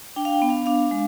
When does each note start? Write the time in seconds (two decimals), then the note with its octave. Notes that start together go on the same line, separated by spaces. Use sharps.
0.16 D4 G5
0.25 F5
0.33 G5
0.42 B3
0.50 F5
0.66 D4 F5
0.91 G#3